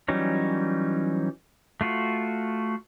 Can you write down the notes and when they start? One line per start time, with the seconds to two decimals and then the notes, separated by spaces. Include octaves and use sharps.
0.08 E3 F#3 G3 C#4 D#4
1.81 A3 F4 F#4